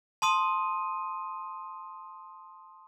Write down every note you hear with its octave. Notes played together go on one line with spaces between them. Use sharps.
A5 C6 D#6 D#7